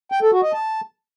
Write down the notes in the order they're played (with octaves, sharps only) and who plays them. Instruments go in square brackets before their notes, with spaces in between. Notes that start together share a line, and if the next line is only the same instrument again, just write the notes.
[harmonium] G5
A4
F#4
D#5
A5